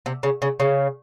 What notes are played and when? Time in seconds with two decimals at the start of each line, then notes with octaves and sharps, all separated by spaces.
0.06 C3
0.23 C#3
0.42 C#3
0.60 C#3